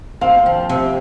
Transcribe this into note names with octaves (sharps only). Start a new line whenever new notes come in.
C4 F5
F3
C3